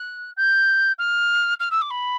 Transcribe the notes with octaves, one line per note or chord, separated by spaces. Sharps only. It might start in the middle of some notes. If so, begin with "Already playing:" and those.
Already playing: F#6
G6
F6
F6
E6
D6
B5